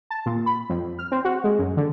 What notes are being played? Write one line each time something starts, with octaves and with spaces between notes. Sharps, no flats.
A5
A#2
B5
F2
F6
C4
F#4
G#3
F#2
D3